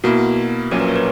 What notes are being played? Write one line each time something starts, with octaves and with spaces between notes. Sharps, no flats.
B2 A#3 E4 F#4
A#1 A#2 F#3 A#3 C#4 A#4
B4
C#5
B4